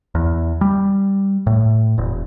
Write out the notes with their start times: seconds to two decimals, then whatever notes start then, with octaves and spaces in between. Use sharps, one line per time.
0.15 E2
0.61 G3
1.47 A2
1.98 E1